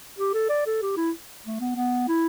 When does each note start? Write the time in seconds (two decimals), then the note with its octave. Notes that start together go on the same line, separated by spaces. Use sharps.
0.18 G4
0.34 A4
0.50 D5
0.67 A4
0.82 G4
0.97 E4
1.45 A3
1.60 B3
1.76 B3
2.08 E4